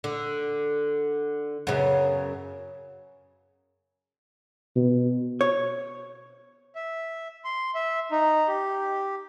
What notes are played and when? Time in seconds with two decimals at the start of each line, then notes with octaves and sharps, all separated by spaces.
0.04 D3
1.67 F#2 C#3 B3
4.75 B2
5.41 C#5
6.75 E5
7.45 C6
7.75 E5
8.11 D#4
8.48 G4